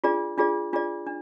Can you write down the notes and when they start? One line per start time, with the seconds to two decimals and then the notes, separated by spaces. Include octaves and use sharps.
0.04 D4 F4 G#4 D5
0.38 D4 F4 G#4 D5
0.73 D4 F4 G#4 D5
1.07 D4